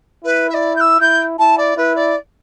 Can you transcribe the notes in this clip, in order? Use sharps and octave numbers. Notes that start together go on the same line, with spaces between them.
E4 B4
E5
D5
G6
E6
E4 G6
E4 A5
D5
E4 B4
D5